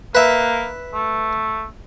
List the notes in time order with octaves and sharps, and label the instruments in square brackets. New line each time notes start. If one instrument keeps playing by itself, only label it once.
[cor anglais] A#3 [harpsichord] B4 E5
[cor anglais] A3